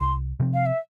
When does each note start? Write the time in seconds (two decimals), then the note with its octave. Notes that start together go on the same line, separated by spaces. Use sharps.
0.01 C2 C6
0.40 C3 F3 C4
0.54 F5
0.66 E5